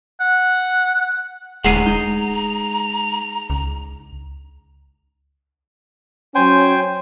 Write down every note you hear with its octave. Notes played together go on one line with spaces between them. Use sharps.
F#5
D#1 D2 G#3 G#4 F#5 A#5 C7 D#7
G#3 D#4
C#2
F#3 C#4 C5 G5 G#5